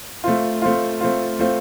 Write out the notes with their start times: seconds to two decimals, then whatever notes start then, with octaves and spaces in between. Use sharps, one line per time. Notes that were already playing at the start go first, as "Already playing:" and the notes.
0.24 A3 C4 F4
0.62 A3 C4 F4
1.01 A3 C4 F4
1.39 A3 C4 F4